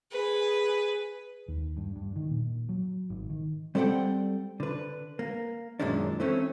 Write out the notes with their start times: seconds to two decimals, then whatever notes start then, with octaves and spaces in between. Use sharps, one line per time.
0.12 G#4 B4
1.48 D#2
1.77 G2
1.96 G2
2.16 D#3
2.31 A#2
2.69 F#3
3.10 G#1
3.30 D#3
3.75 G3 C4 A4 D5 F#5 G5
4.60 D3 B4
5.19 A#3
5.80 F#2 A#2 D#3 G#3 C#4 D4
6.20 E3 A3 C4 C#4